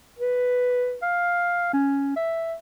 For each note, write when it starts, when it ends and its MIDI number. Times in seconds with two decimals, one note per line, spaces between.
0.19 0.97 71
1.02 1.70 77
1.73 2.13 61
2.16 2.55 76